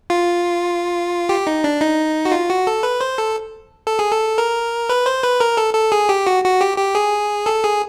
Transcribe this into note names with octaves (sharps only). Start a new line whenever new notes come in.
F4
G4
D#4
D4
D#4
F#4
F4
F#4
A4
B4
C5
A4
A4
G#4
A4
A#4
B4
C5
B4
A#4
A4
A4
G#4
G4
F#4
F#4
G4
G4
G#4
A4
G#4